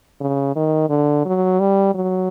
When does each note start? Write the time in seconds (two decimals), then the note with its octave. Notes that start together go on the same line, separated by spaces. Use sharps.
0.21 C#3
0.56 D#3
0.90 D3
1.26 F#3
1.60 G3
1.95 F#3